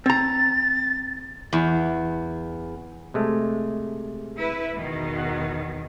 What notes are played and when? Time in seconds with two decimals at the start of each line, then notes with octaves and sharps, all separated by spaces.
0.06 C4 A#5 A6
1.53 E2
3.14 C3 G#3 A3
4.38 E4 B4
4.79 E2 B2 D#3
5.18 F#5